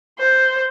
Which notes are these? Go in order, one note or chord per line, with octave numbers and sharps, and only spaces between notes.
C5